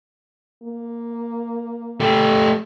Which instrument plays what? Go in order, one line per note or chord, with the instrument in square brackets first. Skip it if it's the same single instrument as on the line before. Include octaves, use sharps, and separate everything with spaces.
[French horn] A#3
[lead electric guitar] A3 G4